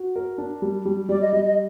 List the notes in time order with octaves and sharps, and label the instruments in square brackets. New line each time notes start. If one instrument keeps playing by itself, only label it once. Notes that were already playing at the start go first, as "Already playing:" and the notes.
Already playing: [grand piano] F#4
A#4
D4
G3
G3
[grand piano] G3 [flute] D5
[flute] D#5
[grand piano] G3 [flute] D#5
[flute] D#5